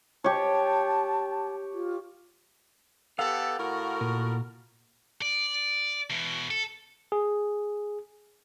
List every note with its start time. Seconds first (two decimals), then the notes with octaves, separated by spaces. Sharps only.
0.24 G4 C#5 A5
1.73 F4
3.19 B3 G4 A4 F5 F#5
3.59 A2 F#4 A#4
4.01 A#2
5.22 D5
6.10 E2 B2
6.51 A4
7.12 G#4